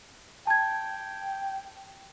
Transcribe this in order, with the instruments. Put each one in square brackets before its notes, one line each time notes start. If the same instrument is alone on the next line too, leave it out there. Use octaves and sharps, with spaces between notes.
[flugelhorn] G5 [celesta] A5 G#6